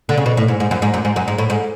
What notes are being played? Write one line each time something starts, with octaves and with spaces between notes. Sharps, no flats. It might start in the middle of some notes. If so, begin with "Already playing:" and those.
D3
C#3
B2
A2
G#2
G#2
F#2
G#2
F#2
G#2
F#2
G#2
A2
G#2